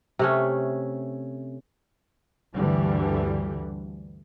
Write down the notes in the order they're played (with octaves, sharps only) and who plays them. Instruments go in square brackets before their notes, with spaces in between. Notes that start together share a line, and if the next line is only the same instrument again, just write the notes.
[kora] C3 A3 C#4
[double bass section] D2 G2 D3 E3 G3